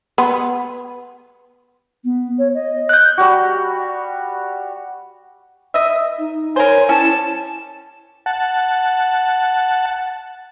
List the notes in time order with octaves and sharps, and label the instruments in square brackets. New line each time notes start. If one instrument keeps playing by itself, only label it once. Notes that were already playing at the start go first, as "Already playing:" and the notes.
[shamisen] B3
[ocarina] B3
C#5
D#5
[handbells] F#6 G6
[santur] G3 F#4
[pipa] D#5 E5
[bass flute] D#4
[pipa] A#4 C5 [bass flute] C#5 [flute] G#5
[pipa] G3 C#4 [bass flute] E4 [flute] A5
[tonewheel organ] F#5 A5